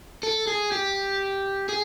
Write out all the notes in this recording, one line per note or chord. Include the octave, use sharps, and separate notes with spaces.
A4
G#4
G4
G#4